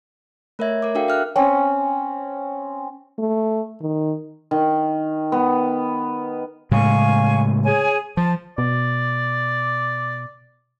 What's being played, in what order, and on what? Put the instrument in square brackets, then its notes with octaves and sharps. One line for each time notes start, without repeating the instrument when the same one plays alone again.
[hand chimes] A3 A#4 C#5 E5 G#6
A#4 E5 D6
D4 F#4 A4 A#4 F5 G5
E5 F6 F#6
[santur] C4 C#4 G#5
[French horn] A3
D#3
[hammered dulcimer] D#3
B3
[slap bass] A2 C#3 G#3 [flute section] F5 G#5 C#6
[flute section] G#4 C#5 G#5
[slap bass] F3 [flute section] A5
[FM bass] B2 [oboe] D5